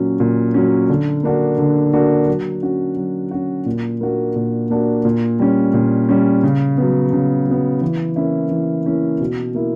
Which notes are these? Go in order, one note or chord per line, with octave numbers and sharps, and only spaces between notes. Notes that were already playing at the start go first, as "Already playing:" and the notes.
Already playing: A#2 F#3 C#4
A#2
F#3 C#4
D3
A#3 D4 F#4
D3
A#3 D4 F#4
F#3
C#4 F#4
F#3
C#4 F#4
A#2
A#3 D4 F#4
A#2
A#3 D4 F#4
A#2
G3 C#4
A#2
G3 C#4
C#3
F#3 B3
C#3
F#3 B3
E3
A#3 C#4 E4
E3
A#3 C#4 E4
B2
A#3 E4